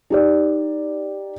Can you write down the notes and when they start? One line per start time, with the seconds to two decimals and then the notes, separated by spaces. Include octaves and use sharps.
0.10 D#4 G4 D5